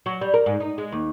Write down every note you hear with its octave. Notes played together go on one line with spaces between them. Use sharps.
F#3
G3
A#4
G#2
D#4
G#3
D#2